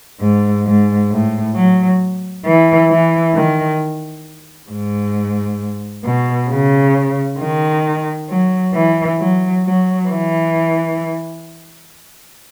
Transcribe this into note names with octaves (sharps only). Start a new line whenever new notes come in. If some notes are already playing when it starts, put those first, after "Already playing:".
G#2
G#2
A2
F#3
E3
E3
D#3
G#2
B2
C#3
D#3
F#3
E3
F#3
F#3
E3